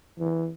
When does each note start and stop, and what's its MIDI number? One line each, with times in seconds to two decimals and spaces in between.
0.19 0.51 52